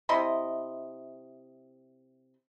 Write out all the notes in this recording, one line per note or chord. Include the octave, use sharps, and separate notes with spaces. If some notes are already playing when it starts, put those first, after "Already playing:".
C3 E4 D#5 C6